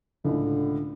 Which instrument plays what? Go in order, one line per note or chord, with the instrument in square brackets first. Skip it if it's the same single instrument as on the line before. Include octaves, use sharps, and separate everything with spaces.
[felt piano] C#2 A2 [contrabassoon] D3